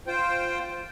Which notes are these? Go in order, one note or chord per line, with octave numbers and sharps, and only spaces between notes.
F4 C5 G5